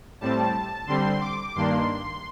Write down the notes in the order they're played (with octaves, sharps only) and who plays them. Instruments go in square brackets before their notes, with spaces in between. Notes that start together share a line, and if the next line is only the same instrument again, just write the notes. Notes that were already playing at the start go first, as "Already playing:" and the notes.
[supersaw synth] A2 G3 C4 A5
D3 G3 C4 C6
D6
G2 D#3 A#3 D4 C6